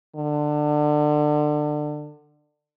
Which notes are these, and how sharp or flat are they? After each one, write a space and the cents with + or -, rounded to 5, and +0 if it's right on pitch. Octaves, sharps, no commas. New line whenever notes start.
D3 +25